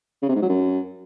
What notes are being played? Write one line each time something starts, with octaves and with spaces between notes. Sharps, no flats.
C#3
C3
G#2
F#3
F#2